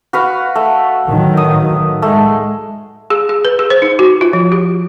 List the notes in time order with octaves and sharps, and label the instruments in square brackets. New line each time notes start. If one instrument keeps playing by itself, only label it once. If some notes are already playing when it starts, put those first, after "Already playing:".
[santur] F#4 B4 F5
A3
[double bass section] A2 D#3 F#3
[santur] D#6
[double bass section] G#3 [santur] A3
[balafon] G#4
G#4
B4
G#4
C5
D#4
F#4
F4
F3
G4